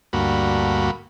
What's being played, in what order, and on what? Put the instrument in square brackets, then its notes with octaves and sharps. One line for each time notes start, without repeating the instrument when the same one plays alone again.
[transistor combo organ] D2 G2 A#3 F#4 B5